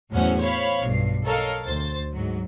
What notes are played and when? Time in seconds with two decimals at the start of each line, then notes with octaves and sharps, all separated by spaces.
0.11 E2 A2 F#3 C#4 C5 F#5
0.40 C5 C#5 F5 B5
0.81 B1 G2 C7
1.25 A4 A#4 C#5 D#5 F5
1.64 D2 C5 A6
2.12 G#2 F#3